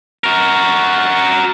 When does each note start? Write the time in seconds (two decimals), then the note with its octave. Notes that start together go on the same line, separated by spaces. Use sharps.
0.24 F#4 A#4